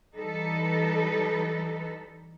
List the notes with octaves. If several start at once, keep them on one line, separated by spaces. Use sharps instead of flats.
E3 G3 D#4 A4 B4